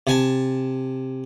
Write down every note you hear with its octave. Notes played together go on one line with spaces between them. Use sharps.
C3 G#5 A5